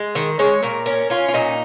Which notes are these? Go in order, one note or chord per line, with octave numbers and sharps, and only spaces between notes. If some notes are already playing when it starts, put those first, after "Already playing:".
Already playing: G#3
D#3
G#3 C#5
A#2 A#4
C#4 A#4
C#4 F4
F4
A#2 D#4